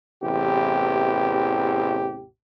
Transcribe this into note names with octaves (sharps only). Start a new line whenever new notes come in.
A1 E2 C3 G4